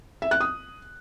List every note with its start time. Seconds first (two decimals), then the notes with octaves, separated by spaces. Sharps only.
0.22 E5
0.31 F#6
0.41 D#6